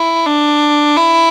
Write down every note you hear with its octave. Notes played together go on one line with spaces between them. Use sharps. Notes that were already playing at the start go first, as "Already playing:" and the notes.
Already playing: E4
D4
E4